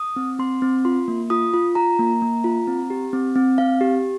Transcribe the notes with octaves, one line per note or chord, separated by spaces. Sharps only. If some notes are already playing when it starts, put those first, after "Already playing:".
Already playing: D#6
C4
C4 C6
C4
F4 C6
A#3
F4 D#6
F4
F4 A#5
A#3
A#3
F4
C4
G4
C4
C4
C4 F5
G4